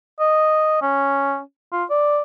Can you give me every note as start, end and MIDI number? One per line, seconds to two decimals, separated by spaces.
0.20 0.77 75
0.82 1.39 61
1.72 1.84 65
1.90 2.22 74